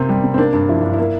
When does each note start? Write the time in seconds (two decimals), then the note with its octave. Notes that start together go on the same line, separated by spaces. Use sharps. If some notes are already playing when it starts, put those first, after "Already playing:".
Already playing: C3 A#3 C4
0.09 G3
0.23 C3
0.34 C4
0.38 A#3 D4
0.53 G2
0.69 F3 E4
0.81 G2 D4
0.94 A#3 E4